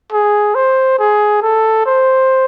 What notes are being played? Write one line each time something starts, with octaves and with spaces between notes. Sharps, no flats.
G#4
C5
G#4
A4
C5